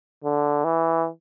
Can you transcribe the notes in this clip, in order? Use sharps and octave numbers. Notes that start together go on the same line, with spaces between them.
D3
E3